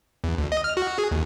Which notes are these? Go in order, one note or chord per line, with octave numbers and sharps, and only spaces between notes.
E2
D2
D#5
F6
F#4
G#4
D#2